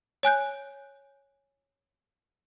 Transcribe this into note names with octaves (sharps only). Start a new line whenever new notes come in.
C#5 G#5 F#6 G6